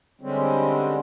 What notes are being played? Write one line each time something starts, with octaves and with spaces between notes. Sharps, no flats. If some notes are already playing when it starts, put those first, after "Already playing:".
D3 G3 G#3 C4 C#4